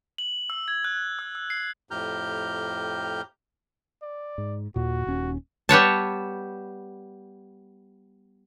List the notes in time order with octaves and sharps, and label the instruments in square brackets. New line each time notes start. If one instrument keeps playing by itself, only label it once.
[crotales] F#7
E6
G#6
F#6
E6
E6
C7
[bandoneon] F2 A2 G4 A#5 F6 G6
[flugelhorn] D5
[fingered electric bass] G#2
[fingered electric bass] D#2 A#2 [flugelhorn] F#4
[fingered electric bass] D#1 D#2 C#4
[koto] G3 B3 C#5 A5